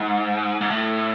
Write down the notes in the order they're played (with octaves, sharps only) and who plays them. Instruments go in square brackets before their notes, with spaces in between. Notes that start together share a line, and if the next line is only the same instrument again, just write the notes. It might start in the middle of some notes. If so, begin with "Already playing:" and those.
Already playing: [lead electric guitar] G#2
G#2
A2